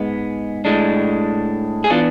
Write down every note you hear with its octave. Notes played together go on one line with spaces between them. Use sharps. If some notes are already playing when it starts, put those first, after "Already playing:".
Already playing: G#2 G#3 B3
A2 G#3 D4
G#4
E3 B3 D4 F4